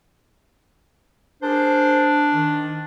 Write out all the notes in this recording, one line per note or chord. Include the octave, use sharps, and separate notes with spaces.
D4 G#4 A#4 C5
D#3